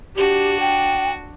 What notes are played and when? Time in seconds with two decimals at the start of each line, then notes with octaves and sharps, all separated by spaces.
0.16 D4 F#4 G4
0.60 G5